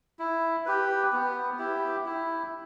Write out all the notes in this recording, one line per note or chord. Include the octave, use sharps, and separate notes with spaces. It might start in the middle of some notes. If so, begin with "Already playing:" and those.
E4
G4 B4
B3
E4 G4
E4